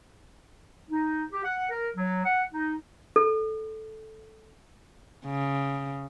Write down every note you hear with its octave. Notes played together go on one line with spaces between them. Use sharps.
D#4
G4
F#5
A#4
F#3
F#5
D#4
A4
C#3